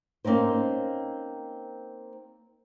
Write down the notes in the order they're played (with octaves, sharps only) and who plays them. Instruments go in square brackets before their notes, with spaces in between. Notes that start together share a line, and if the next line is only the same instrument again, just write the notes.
[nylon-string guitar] A#3 C4 C#4 D#4 C5